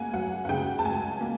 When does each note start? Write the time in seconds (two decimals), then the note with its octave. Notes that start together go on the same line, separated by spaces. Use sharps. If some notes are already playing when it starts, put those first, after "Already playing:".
Already playing: C#2 A#3 F5 F#5 G#5
0.14 F#3 F#5
0.45 F#5
0.49 C#3 G5
0.79 A5
0.85 C#2 G#5
1.21 A#3